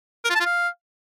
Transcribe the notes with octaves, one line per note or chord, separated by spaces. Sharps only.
A#4
F4
A5
F4
F5